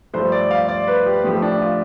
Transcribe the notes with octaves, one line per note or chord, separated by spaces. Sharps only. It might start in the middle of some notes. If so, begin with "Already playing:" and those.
G2 F3 A3 C5
D5
F5
D5
B4
G4
A2 F3 A3 G4
D4
F4